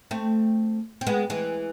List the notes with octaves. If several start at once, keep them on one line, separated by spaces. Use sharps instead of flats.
A3 C4
C4
G#3 B3
E3 G#3